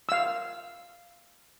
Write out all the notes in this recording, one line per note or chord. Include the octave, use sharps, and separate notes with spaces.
F5 E6